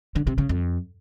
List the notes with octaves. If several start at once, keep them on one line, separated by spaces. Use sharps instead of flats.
D3
C3
C#3
F2